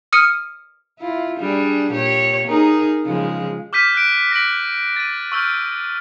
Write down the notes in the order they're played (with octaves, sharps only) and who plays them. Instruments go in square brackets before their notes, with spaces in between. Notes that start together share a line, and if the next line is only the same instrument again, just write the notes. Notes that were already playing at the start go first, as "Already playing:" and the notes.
[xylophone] D#6 F6 C#7 D#7
[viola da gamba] E4 F4
G3 D4 G#4
A#2 G4 C#5
D#4 G#4 A#4
C#3 F3 G#3
[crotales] D6 F6 G6 B6 D#7
F#6 D7
A#6 B6 D7 F#7
A6 D#7
C#6 E6 F6 G6